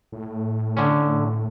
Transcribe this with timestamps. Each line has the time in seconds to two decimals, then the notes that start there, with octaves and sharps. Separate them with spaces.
0.12 A2
0.77 D3 C#4